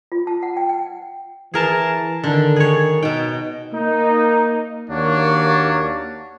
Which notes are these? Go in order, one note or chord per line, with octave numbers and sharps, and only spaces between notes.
F4
A5
F#5
G5
G5
E3 G#4 A#4 A5
D3 D#3 D4
G#4 C#5
B2 D#4 G5
A#3 D#4
D#2 A#3 D4 F#4 C#5